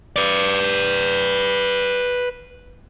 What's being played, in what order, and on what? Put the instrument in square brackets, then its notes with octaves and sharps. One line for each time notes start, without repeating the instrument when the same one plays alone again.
[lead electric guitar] B4 D5